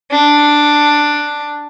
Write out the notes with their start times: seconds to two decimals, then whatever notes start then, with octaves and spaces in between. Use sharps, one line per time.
0.11 D4